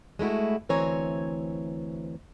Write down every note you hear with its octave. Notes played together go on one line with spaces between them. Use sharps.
G#3 A3 E4 F#4
D2 E3 C4 C#5 G#5 A#5